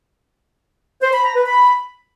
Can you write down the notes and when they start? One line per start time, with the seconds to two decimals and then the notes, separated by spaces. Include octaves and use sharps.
1.02 C5
1.13 B5
1.24 A#5
1.35 B4
1.46 B5